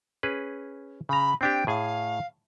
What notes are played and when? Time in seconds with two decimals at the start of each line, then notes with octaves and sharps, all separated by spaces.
0.23 C#4 G#4 B4
1.09 C#3 A#5 B5
1.41 C4 D4 G4 G5
1.67 A2 G#4 F5 G#5